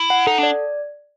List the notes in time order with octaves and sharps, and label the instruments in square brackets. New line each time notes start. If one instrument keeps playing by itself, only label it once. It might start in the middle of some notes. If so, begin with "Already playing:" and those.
Already playing: [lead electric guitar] E4
[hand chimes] F#5
[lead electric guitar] D#4 [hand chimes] A4
[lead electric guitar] D4
[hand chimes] D5